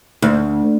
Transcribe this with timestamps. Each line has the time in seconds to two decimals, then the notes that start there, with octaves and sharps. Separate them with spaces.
0.22 D2